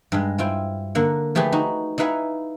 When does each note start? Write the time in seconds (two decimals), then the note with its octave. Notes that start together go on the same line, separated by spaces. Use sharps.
0.12 G2 G#3
0.38 E4 F4 C5 G5
0.95 D3 A#3 F#5
1.35 F3 A3 G4 G#4 B4
1.52 D#4 F#4
1.98 D#4 E4 B4 F5 F#5 G#5